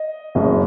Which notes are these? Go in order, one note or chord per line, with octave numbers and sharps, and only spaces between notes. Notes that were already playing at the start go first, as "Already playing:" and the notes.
Already playing: D#5
F#1 F#2 C#3